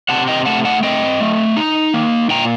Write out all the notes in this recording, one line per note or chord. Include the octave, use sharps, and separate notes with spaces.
C3 F#5 A5
D#5 G5
A3 F#5 A5
F#5 A5
C4 D#5 G5
A3
D#4
A#3
A#2 G5 A#5